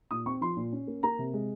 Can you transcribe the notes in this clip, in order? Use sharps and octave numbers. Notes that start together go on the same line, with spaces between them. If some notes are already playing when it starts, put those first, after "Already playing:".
A#2 D#6
C4 C#6
F3 C6
A#2
C#4
A#3
A#3 A#5
C3
G#3